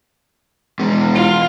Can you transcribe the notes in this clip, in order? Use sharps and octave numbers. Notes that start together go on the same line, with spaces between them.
E2 G#3
F4